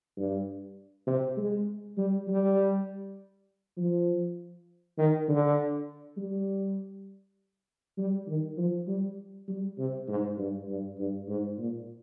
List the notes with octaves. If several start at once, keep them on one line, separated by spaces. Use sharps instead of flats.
G2
C3
G#3
G3
G3
F3
D#3
D3
G3
G3
D#3
F3
G3
G3
C3
G#2
G2
G2
G2
G#2
A#2